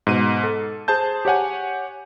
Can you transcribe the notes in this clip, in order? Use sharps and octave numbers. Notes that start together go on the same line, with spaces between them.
G#2 B2 D#7
A4
G#4 C5 A5 G6
G4 C#5 F#5 G#5